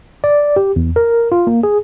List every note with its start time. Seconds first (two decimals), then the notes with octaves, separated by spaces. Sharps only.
0.24 D5
0.56 G4
0.76 E2
0.96 A#4
1.32 F4
1.47 A#3
1.63 G#4